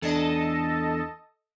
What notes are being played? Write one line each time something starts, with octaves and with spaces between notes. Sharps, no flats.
E2 D4 A4 D#5 A5